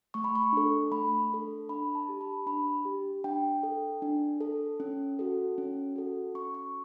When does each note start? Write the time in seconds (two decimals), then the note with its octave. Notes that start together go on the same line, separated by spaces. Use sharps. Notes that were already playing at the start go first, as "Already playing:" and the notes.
0.14 A3 C#6
0.24 B5
0.35 C#6
0.53 D4 A4
0.91 A3 B5
1.30 D4 A4
1.69 D4 B5
1.95 A5
2.09 G4
2.21 B5
2.46 D4 B5
2.85 G4
3.24 D4 G5
3.63 A4
4.02 D4
4.41 A4
4.80 C#4
5.19 F#4 A4
5.58 C#4
5.96 F#4 A4
6.35 C#4 C#6
6.54 C#6